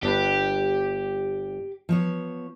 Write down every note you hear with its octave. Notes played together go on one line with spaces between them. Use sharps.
G1 D4 G4 B4
F3 B3 C#5